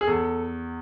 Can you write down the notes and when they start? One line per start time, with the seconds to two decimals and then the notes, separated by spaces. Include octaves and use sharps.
0.01 G#4
0.07 E2 A4